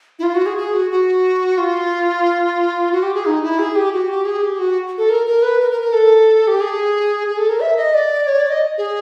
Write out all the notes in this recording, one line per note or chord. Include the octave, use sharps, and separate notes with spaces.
E4
F4
F#4
G#4
G#4
F#4
F#4
F4
F#4
G4
G#4
D#4
E4
G#4
G4
F#4
G4
G#4
G4
F#4
A4
A#4
A#4
B4
A#4
A#4
A#4
A4
G4
G#4
G#4
A4
A#4
E5
D#5
D5
C#5
D5
D#5
G#4